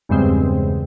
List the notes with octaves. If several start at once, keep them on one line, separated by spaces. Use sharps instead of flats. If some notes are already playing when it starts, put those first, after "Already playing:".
E2 G2 C#3 G#3 C4